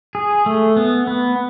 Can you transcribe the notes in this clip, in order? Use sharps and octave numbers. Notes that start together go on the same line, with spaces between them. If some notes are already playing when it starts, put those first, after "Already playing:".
G#4
A3
B3
B3